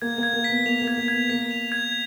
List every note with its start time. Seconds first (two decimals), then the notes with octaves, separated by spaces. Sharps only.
0.02 A#3 G#6
0.18 A#3
0.23 G#6
0.34 A#3
0.44 B6
0.50 B3
0.66 A#3 F7
0.82 A#3
0.88 G#6
0.98 A#3
1.08 G#6
1.14 B3
1.30 A#3 B6
1.51 F7
1.72 G#6